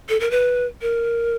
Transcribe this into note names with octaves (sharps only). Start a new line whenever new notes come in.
A4
A#4
B4
A#4